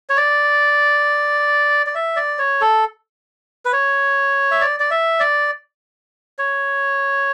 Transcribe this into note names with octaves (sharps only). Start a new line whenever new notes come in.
C#5
D5
D5
E5
D5
C#5
A4
B4
C#5
E5
D5
D5
E5
D5
C#5